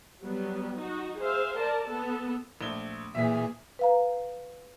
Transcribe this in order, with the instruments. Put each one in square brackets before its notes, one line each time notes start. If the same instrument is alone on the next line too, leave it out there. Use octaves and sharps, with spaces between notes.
[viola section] F#3 G3 B3
D#4 F#4
G#4 C5 E5 F5
A#4 D5 A5
B3 A4
[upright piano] A#1 A3 G7
[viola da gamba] A#2 E3 G#4 [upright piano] E5 B6
[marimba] B4 F5 A#5